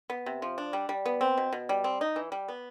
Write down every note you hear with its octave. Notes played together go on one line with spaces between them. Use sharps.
B3
C3
F3
D4
G3
G3
B3
C4
B2
B2
G3
C4
D#4
E3
G3
B3